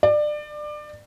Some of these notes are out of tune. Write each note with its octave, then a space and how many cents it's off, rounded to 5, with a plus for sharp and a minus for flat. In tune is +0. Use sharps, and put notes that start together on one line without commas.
D5 +25